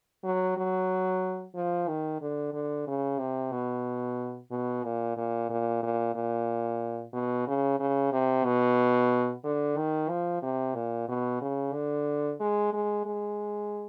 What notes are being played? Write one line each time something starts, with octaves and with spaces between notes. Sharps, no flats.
F#3
F#3
F3
D#3
D3
D3
C#3
C3
B2
B2
A#2
A#2
A#2
A#2
A#2
B2
C#3
C#3
C3
B2
D3
D#3
F3
C3
A#2
B2
C#3
D3
G#3
G#3
G#3